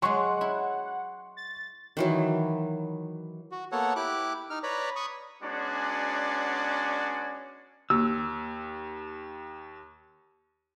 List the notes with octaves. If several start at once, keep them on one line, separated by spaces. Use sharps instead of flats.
F#3 G#3 F#5 C6 C#6
E4
A6
D#3 E3 F#3
F#4
A#3 B3 A4 C#5 F#5
E4 G4 D6 F#6
D#4 F6
B4 C#5 D5 A#5 B5
B5 C#6 D#6
G#3 B3 C#4 D4 F#4 D5
D#2 E6